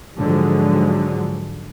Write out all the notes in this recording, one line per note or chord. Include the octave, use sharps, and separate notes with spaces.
G#2 D3 F3 F#3 G#3